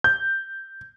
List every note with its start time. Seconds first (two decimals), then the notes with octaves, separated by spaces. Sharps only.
0.04 G6